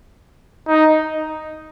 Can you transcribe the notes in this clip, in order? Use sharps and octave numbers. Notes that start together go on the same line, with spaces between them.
D#4